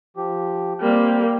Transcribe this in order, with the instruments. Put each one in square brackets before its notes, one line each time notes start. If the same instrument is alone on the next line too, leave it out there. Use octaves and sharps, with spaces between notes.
[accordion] F3 G4
[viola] G3 A#3 [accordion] C4